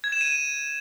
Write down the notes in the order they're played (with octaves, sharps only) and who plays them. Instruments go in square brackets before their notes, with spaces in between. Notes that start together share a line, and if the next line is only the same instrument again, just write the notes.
[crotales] G#6
E7
D#7